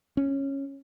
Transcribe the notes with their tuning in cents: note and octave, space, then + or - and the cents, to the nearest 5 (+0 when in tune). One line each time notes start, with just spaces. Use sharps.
C#4 -10